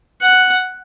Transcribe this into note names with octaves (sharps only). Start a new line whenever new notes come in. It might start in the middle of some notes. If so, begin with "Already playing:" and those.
F#5